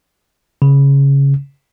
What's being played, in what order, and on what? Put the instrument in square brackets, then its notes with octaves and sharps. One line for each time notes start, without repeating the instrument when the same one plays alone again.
[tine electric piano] C#3